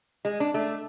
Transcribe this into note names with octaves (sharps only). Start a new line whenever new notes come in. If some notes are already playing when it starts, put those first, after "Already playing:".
G#3
D4
A3